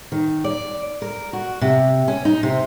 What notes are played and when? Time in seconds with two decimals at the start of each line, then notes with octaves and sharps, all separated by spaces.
0.12 D#3
0.44 D5
1.02 A#4
1.33 F#4
1.61 C3
2.08 C#4
2.25 D#4
2.43 C3